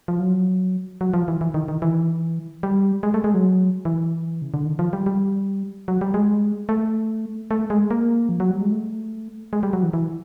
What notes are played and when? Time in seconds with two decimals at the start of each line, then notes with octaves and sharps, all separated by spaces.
0.08 F3
0.20 F#3
1.01 F#3
1.14 F3
1.28 E3
1.41 E3
1.54 D#3
1.68 D#3
1.82 E3
2.63 G3
3.03 G#3
3.14 A3
3.24 G#3
3.34 F#3
3.85 E3
4.42 C#3
4.54 D3
4.66 D#3
4.79 F3
4.93 G3
5.06 G3
5.88 F#3
6.01 G3
6.14 G#3
6.69 A3
7.51 A3
7.70 G#3
7.91 A#3
8.29 F3
8.40 F#3
8.50 G3
8.61 G#3
8.71 A3
9.53 G#3
9.63 G3
9.73 F#3
9.83 E3
9.93 E3